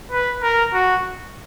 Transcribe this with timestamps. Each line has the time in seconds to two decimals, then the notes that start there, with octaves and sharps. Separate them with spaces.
0.12 B4
0.43 A#4
0.74 F#4